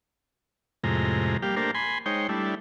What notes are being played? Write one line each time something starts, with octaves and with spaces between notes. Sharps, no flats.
F2 A2 C3 G#3 A#5
G3 A#3 G4 F5
A3 A#3 D4 G4 A#4 C5
G#5 B5 C6
G#3 D#4 C5 C#5 G5
G3 A3 D4 E4